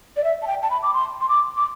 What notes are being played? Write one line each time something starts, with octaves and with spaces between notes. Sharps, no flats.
D5
E5
A5
G5
A5
B5
D6
C6
C6
D6
D6